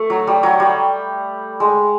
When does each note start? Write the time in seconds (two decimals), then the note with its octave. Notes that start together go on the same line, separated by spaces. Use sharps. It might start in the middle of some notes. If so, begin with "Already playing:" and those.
Already playing: A3
0.10 F#3
0.27 G3
0.43 F#3
0.60 G3
1.60 G#3